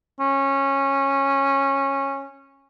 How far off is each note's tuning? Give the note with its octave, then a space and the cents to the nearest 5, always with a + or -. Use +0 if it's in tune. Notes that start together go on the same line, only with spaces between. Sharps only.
C#4 -15